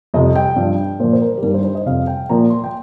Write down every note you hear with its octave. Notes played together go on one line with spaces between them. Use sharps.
F2 C3 G3 D#5
G5
G2 F3
A#2 F3 C5
C5
A#4
G4
G2 D#3 G3 A#4
C5
C5
D#5
F2 C3 G3 F5
G5
A#2 F3 A#5
C6
G5